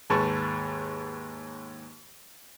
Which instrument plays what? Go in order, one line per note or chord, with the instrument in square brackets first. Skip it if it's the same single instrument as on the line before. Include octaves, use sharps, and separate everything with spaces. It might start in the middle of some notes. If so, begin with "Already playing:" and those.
[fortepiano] D#2 G#2 G#3 B4 A5 C#6